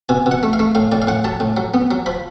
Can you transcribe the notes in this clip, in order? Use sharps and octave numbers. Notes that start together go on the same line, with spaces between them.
B2 G#5
B2
F#5
A3
F5
A3
A2 F5
A2 D5
F5
A2 F#5
F#3 A5
A2
F#3
B3
F#3
F3 B5